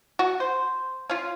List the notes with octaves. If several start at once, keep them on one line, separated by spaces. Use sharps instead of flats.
F#4
C5
C#4 F4